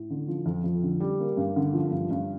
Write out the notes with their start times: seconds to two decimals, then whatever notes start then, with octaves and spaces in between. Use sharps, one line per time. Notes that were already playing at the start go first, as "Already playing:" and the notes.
Already playing: A2
0.10 D3
0.28 F3
0.46 F2
0.64 F2
0.83 D3
1.00 G3
1.20 A#3
1.37 G2
1.56 D3
1.74 F3
1.92 G2
2.11 G2